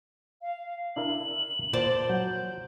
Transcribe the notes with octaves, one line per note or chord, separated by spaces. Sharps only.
F5
D4 E4 A#4 F#7
A#2 C5 D5 A5
F#3 G6